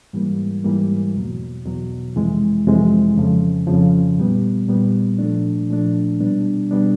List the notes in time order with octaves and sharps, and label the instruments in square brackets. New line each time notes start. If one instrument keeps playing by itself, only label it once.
[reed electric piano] G#2 E3 G3 A#3
G#2 E3 G3 A#3
E2 B2 F#3
E2 B2 F#3
F2 C3 E3 G#3
F2 C3 E3 G#3
F2 C#3 F3
F2 C#3 F3
A#2 G3 B3
A#2 G3 B3
A#2 F3 A3 D4
A#2 F3 A3 D4
B2 G3 B3 D4
B2 G3 B3 D4